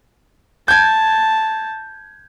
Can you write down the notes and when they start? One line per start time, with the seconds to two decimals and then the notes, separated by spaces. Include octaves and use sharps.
0.68 A5 G6 G#6